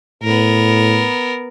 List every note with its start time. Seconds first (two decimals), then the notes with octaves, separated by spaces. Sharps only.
0.23 A2 B3 A#4